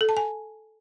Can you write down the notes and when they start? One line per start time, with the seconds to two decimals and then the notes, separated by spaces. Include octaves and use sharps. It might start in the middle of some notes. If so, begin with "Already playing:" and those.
0.01 A4
0.09 A5
0.17 G#5